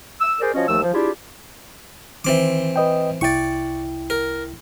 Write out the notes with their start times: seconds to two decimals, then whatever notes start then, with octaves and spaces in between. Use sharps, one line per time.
0.21 E6
0.41 G#4 A#4 C5 D5
0.54 F3 C#4 F#4 C#5 D#5
0.67 D#2 F3 A3 E6
0.82 F3
0.93 D4 E4 F4 G4 G#4
2.25 D#3 E3 C4 D6
2.76 B4 D#5 G5
3.21 C2 E4 D5 G5 C#6
4.10 A#4